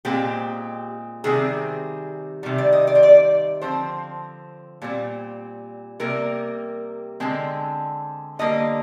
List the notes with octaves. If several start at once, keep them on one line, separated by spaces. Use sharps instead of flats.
A#2 G#3 C4 G4
C3 D#3 G3 C4 G#4
C3 D#3 G3
D5
D#5
D5
C5
D5
D3 F3 C4 C5
A#2 G3 C4
C3 G3 A#3 A#4
D3 G#3 C4
D3 G3 A#3 D#5